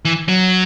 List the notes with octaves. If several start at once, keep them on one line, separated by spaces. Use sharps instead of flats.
E3
F#3